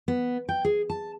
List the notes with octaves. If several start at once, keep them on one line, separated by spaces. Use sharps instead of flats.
B3
G5
G#4
A5